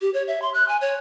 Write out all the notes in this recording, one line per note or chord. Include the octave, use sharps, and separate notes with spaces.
G4
C#5
E5
C6
F#6
G#5
C#5